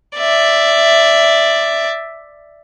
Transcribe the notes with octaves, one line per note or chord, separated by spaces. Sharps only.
D5 E5